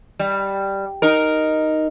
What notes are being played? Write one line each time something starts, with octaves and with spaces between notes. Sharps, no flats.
G3
D#4 A#4